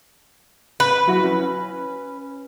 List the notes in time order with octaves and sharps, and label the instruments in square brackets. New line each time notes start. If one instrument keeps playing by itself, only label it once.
[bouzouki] B4 [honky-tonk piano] B5
[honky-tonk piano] F#3 E4 F#4
C#4